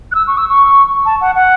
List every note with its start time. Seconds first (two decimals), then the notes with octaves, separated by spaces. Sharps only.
0.12 F#6
0.15 E6
0.27 C#6
0.37 E6
0.49 C#6
1.05 A5
1.21 F#5
1.35 F#5